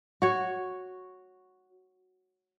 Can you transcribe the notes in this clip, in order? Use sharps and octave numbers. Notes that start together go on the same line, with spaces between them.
F#4 C#5